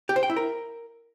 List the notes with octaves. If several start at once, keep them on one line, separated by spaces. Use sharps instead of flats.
G4
C5
G5
E4
A#4